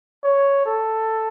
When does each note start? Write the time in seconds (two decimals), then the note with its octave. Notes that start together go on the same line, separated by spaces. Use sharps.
0.24 C#5
0.66 A4